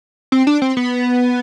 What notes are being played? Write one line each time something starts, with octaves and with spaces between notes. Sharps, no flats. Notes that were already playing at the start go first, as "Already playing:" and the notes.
C4
D4
C4
B3